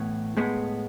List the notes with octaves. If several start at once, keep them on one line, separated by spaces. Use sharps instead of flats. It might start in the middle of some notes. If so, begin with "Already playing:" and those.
Already playing: A2 E3 B3
A2 G#3 B3